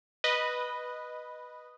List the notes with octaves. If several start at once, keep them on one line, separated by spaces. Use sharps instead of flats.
B4 D#5